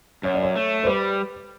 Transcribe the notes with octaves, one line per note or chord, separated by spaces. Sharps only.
F#2 C#5
D5
C#5
A3
C5
G3 B4